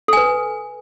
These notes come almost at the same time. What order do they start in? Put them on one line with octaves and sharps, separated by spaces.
A4 G#5 B4